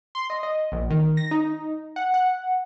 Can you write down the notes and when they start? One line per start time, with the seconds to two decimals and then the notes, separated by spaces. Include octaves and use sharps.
0.15 C6
0.30 D#5
0.43 D#5
0.72 A#1
0.90 D#3
1.17 A#6
1.31 D#4
1.96 F#5
2.14 F#5